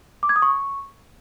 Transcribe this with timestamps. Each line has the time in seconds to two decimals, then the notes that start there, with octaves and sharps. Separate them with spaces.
0.23 D6
0.29 G#6
0.36 D#6
0.42 C#6